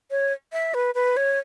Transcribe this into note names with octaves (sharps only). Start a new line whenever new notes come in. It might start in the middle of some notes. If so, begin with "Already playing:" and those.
C#5
E5
B4
B4
C#5